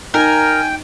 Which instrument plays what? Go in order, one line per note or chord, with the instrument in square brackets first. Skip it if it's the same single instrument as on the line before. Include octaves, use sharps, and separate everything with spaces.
[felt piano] D#4 [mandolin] A#4 [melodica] G5 [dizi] G#5